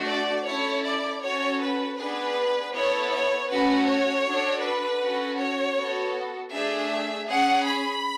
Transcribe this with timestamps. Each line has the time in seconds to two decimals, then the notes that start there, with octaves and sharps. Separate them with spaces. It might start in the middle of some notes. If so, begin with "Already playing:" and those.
Already playing: A3 D4 F#4
0.09 D5
0.47 C#4 E4 A4 C#5
0.85 D5
1.23 C#4 F#4 A4 C#5
1.61 B4
1.99 B3 D4 G#4 B4
2.74 B3 E4 A4 C#5
3.12 C#5
3.50 A3 C#4 F#4 A4 B4
3.88 C#5
4.26 D4 F#4 A4
4.64 B4
5.02 C#4 F#4 A4
5.39 C#5
5.77 B3 F#4 A4
6.53 A3 D4 G#4 E5
7.29 C#4 G#4 F#5
7.66 B5